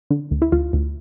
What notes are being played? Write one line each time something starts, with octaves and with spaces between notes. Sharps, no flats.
D3
D2
E4
D2 F4
D2